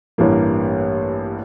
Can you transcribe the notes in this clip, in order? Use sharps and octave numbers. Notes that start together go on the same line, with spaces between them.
A1 G2 E3 G3 A#3